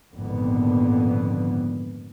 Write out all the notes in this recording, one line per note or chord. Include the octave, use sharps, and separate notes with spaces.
G#1 F2 A#2 D3 B3